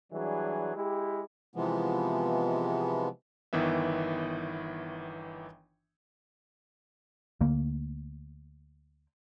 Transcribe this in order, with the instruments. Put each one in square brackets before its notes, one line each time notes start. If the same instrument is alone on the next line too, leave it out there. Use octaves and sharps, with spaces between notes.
[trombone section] E3 F#3 G3 D4 G#4
G#3 E4 G4
[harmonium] C3 E3 F3 G#3 B3
[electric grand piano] G1 D#3 E3 B3 E5
[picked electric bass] D2 D3 A#3